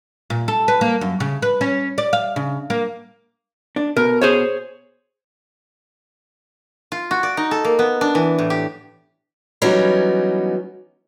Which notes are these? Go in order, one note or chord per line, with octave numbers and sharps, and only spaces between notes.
A#2
A4
B4
A#3
F#2
C#3
B4
C#4
D5
F5
C#3
A#3
D4
B2 A#4
G#4 C5 C#5
F4
F#4
D5
D#4
A4
A#3
B3
D4
E3
A2
G4
E3 F#3 G3 B3 C#4 D#4